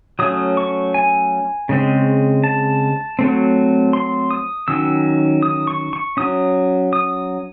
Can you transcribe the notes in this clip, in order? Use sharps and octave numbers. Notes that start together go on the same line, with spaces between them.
F#3 A3 C#4 D#6
C#6
G#5
C#3 G#3 C4
A5
F#3 A3 C4
C6
D#6
D#3 F#3 C#4 E6
D#6
C#6
C#6
F#3 C#4 D#6
D#6